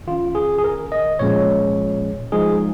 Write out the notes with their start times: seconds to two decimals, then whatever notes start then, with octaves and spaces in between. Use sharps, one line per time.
0.07 D#3 C#4 F4
0.35 G#4
0.58 G#4
0.64 A#4
0.92 D#5
1.19 A#2 F3 G#3 C#4 C#5
2.32 F3 G#3 D#4 G#4